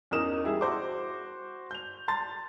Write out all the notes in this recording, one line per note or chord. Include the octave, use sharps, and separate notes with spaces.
E2 C#4 D#4 A#4 D#6 E7
G3 E4 G#4
F#4 C5 D6
G6 F7
A5 C6 A6